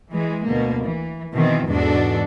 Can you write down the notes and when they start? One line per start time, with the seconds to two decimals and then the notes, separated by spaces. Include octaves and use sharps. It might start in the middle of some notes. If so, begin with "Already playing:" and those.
0.12 E3 G#3
0.46 D2 B2 A#3
0.84 E3
1.35 B2 D#3 E3 C4
1.70 E2 G#2 B2 D4 F#4 A4